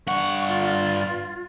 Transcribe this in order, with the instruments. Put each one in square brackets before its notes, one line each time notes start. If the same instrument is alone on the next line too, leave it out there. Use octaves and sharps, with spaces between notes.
[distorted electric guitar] G2 F#5 [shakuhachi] C#6
[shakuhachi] F4